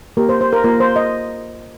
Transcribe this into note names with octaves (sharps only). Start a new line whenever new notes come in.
A#3 G4 A#4
C5
C5
A#4
A#3 F4 A#4
C5
D#5